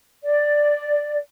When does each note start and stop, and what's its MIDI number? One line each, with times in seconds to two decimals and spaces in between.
0.23 1.18 74